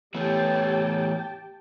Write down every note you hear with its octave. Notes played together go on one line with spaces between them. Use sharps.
E3 A3 B3 G4 C#5 G5 A5